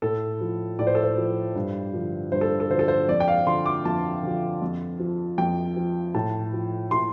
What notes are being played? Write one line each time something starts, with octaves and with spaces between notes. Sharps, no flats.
A2 A4
F3
A2 D5
C5
A4
C5
F3
G2
D3 F3
G2 C5
A4
A4
D3 F3 C5
A4
C5
F2 D5
G5
F5
D3 F3 C6
D6
F2 A5
D3 F3
F2
F3
F2 G5
F3
A2 A5
F3
A2 C6